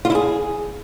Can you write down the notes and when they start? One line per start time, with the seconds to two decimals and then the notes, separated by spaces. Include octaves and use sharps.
0.05 F4
0.10 E4
0.15 G#4